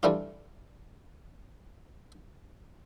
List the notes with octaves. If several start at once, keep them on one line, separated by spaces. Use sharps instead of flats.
E3 G3 A3 D4 F4